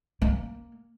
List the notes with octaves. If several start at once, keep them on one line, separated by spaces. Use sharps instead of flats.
A#3